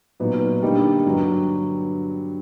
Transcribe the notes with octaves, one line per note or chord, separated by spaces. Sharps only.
A#2 F#3 B3 D#4
D3 G3 A#3 D#4
G2 D3 F#3